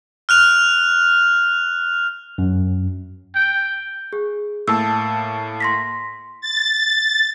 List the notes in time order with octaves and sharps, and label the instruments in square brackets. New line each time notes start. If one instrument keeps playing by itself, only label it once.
[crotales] F6 F#6 F7
[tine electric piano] F#2
[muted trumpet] G5
[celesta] G#4
[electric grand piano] A2 A#3 A5 [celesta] E6
[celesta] C6 A#6 B6
[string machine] A6